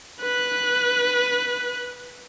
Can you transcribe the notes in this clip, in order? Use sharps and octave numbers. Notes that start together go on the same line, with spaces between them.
B4 F#6